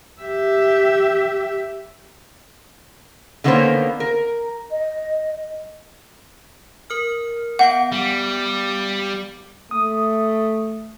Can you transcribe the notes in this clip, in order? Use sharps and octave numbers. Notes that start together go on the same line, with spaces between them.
G4 E5
D3 D#3 A#3 B3 C#4 C5
A#4
D#5
A#4 F6
B3 F5 F#5 D7
G3
A3 D#6